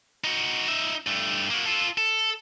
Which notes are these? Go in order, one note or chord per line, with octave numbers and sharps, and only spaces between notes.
D#4 F#4
D#4 E5
G2 A3
A#3 F#4
F4 A4
A4